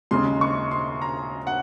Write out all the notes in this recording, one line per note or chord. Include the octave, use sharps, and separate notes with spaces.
D#2 C#3 G#3 C6
C#6
C6
A#5
F#5